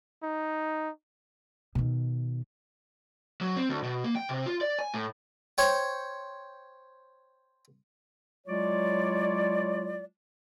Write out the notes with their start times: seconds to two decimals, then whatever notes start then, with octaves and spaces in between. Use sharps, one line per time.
0.23 D#4
1.75 B2 D#3
3.41 F#3
3.56 C4
3.69 D2
3.83 B2
4.04 A#3
4.15 G5
4.29 C3
4.46 F4
4.61 D5
4.79 G#5
4.94 A2
5.58 C5 C#5 G5
8.47 F#3 G#3 E4 F4 C#5 D5